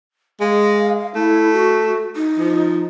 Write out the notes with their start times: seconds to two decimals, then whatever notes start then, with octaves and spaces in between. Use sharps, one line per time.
0.40 G#3 F5
1.15 A3 E4
1.53 F#4
2.16 D#4
2.39 F3